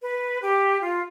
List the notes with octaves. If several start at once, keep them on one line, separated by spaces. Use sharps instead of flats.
B4
G4
F4